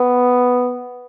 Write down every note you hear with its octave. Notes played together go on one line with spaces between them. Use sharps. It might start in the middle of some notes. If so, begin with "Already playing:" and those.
Already playing: B3